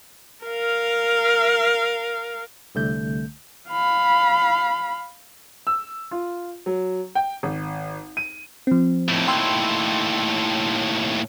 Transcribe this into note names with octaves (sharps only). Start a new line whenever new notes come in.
A#4 F5
C2 D3 A3 G6
F5 B5
E6
F4
F#3
G5
G#1
D#7
F3 C4
D#2 A2
G5 C6 E6